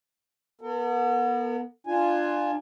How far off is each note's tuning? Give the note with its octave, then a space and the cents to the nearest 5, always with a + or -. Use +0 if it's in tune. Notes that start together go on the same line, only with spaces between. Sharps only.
B3 -30 A4 +45
D4 +25 F4 -5 G#5 +0